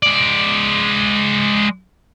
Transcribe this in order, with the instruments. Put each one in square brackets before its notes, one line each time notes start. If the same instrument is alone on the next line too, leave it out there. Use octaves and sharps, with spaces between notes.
[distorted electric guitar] G#3 D5